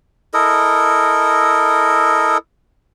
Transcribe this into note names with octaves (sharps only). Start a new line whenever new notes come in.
E4 A4 A#4 D#5